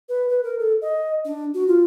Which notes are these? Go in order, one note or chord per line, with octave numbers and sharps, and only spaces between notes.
B4
B4
A#4
A4
D#5
D4
F#4
F4